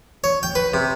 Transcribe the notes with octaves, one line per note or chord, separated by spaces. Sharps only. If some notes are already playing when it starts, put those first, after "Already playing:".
C#5
G5
B4
C3